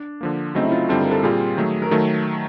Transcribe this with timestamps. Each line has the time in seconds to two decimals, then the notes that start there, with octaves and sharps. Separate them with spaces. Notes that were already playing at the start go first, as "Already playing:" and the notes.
Already playing: D4
0.21 D3 F3 A#3
0.55 C#3 F#3 A3 C4 D#4
0.63 E4
0.72 F4
0.89 G2 D3 G3 C4 F4 A4
1.01 A#4
1.11 A4
1.23 A#2 G3 C4 F4 G#4
1.57 D#3 F#3 A3
1.82 A#4
1.91 D#3 F#3 A3 A4